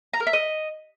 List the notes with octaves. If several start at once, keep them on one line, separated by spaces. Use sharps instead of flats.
A#5
A#4
E5
D#5